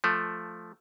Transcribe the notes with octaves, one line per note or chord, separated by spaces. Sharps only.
F3 A3